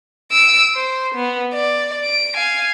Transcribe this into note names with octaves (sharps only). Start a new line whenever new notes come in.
E6 D7
C5
B3
D5
D7
F5 G#5